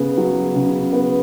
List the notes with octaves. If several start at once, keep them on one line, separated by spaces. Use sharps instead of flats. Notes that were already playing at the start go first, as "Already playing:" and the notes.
Already playing: C#3 B3
F#3
C#3
B3